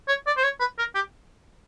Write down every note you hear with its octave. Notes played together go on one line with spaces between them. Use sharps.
C#5
D5
C5
C#5
B4
A#4
G4